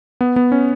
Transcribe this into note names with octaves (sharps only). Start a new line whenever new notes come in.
B3
B3
C#4